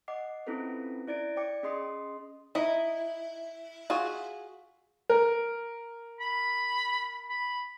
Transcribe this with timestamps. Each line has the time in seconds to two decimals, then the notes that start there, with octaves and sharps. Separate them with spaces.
0.08 D#5 F#5 D6 C7
0.47 C4 C#4 E4 F4 A4 B4
1.07 E4 D5 A6 D7
1.36 C#5 D5 G5 D6 C#7
1.63 C#4 G#4 D#5 C6 D#6 C7
2.55 D#4 E4 D#5
3.90 F4 F#4 G#4
5.10 A#4
6.20 B5
7.29 B5